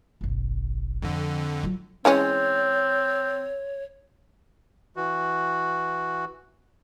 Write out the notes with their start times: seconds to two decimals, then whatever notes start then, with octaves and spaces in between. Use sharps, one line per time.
0.21 F#1 B1
1.02 F2 D3 F3
1.63 F#3 F4
2.05 E3 G#3 C4 C#4 C#5
4.96 E3 F#4